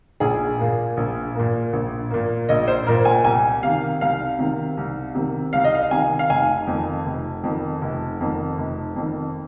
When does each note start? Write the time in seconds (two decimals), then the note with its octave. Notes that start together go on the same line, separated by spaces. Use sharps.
0.20 A#1 G#4
0.59 A#2 A#3
0.97 A#1
1.35 A#2 A#3
1.73 A#1
2.10 A#2 A#3
2.49 A#1 D#5
2.68 C5
2.87 A#2 A#3 A#4
3.05 G#5
3.24 C2 G#5
3.63 C3 D#3 F5
4.01 C2 F5
4.39 C3 D#3
4.77 C2
5.15 C3 D#3
5.53 C2 F5
5.64 D#5
5.75 F5
5.91 C3 D#3 G#5
6.19 F5
6.30 F1 G#5
6.67 F2 D#3
7.06 F1
7.44 F2 D#3
7.82 F1
8.20 F2 D#3
8.58 F1
8.96 F2 D#3